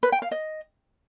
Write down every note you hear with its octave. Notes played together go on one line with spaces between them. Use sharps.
B4
G5
F5
D#5